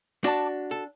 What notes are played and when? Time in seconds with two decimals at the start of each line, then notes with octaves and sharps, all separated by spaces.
0.24 D4 F#4 D5 A5 D6
0.71 A4